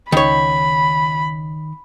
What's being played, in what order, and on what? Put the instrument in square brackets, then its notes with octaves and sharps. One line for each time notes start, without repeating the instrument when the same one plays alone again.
[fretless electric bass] C#2 [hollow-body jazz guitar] D#3 C#5 [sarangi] B5